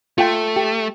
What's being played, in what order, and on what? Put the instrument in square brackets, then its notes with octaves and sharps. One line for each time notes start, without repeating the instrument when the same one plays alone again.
[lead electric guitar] A3 [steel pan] F4 G5 G#5
[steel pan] G4 G5